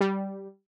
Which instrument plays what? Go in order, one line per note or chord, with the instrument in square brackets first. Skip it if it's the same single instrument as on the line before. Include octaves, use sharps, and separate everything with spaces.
[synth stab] G3